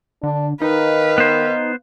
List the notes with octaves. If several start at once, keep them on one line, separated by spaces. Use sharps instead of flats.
D3 D4
D#3 D#4 B4 F5
B3 C5